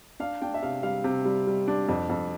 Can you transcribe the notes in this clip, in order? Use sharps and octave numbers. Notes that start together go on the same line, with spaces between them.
D4 F5
D4 G5
E5
C3 F5
G3 F5
C3
G3
G3
D4
F2
F2